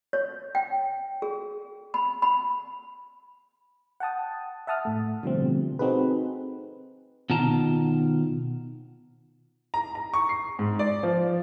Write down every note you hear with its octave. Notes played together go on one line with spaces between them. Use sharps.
C#5
G5
G#4
B5
B5
F#5 G5 A5 D#6
E5 F#5 A5 D#6 F6
A2 A3
B2 D3 F3 G3 A3 C4
C4 D#4 F#4 G#4 A4 B4
B2 D#3 F4 A5 A#5
A#5
A#5
C#6
C7
G#2
D5
F3